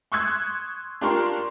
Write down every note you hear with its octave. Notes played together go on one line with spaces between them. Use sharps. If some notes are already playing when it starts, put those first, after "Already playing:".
C6 C#6 D#6 E6 F#6 G#6
D4 F4 G4 A#4 C6 C#6